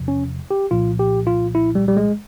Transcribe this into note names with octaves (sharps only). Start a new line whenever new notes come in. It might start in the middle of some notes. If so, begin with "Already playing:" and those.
Already playing: E2 C3 F3
C#4
G4
C2 A#2 F3 F4
G4
F4
E4
G3
G3
G#3